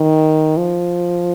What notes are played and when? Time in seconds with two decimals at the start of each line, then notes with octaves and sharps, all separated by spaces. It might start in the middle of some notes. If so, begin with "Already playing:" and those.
Already playing: D#3
0.57 F3